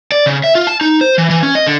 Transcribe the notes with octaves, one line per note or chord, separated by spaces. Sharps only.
D5
C#3
E5
F4
A5
D#4
C5
E3
E3
C#4
D#5
D3